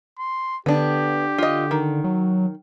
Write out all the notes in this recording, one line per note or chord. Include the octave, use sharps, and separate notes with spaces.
C6
D3 B3 D4 G4
F4 D#5
D#3
F#3